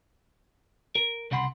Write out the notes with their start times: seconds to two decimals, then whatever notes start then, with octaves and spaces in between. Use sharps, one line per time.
0.95 A#4
1.31 C2 C#3 F#5 B5 C6